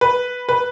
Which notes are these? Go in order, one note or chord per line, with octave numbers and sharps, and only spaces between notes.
B4
B4